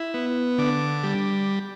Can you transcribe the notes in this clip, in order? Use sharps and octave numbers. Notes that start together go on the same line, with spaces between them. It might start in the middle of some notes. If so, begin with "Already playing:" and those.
Already playing: E4
B3
D3 D6
G3